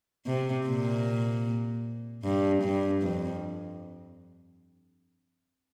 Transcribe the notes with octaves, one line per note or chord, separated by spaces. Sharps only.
C3
A#2
G2
G2
F2